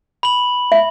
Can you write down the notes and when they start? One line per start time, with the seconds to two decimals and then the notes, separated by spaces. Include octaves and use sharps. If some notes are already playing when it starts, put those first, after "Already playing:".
0.23 B5 F#7
0.72 E5